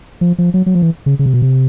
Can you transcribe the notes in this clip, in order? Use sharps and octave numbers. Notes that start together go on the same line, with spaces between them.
F3
F3
F#3
F#3
F3
E3
C#3
C#3
C3
B2
C3